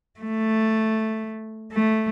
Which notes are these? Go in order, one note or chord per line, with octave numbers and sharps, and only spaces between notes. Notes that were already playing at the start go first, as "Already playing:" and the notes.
A3
A3